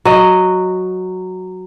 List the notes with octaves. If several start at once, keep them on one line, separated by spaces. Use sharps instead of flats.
F#3 D#5